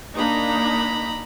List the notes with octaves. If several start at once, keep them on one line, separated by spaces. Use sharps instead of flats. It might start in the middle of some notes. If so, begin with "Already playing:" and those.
A#3 D4 D#4 A#5 B5